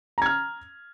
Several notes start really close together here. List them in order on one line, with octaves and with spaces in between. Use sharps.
A#5 G#6 F6